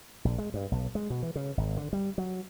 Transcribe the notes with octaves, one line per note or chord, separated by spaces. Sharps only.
A#1
G#3
G2
B1
G#3
B2
E3
C#3
G#1
D3
G3
F#3